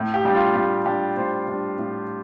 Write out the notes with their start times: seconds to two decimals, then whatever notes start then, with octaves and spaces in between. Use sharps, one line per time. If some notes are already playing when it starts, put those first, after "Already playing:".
Already playing: A2
0.14 G4
0.25 G3 D4 G4
0.34 F4
0.55 A2 G4
0.86 G3 D4 G4
1.17 A2 C5
1.48 G3 D4
1.78 A2